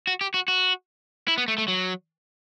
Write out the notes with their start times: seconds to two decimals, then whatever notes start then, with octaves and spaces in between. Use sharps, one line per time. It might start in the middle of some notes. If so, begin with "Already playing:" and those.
0.07 F#4
0.21 G4
0.34 F#4
0.48 F#4
1.28 E4
1.38 B3
1.48 A3
1.58 A3
1.68 F#3